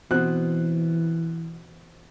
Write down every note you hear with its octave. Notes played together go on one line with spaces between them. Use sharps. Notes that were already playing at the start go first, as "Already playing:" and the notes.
B2 E3 C4 F#6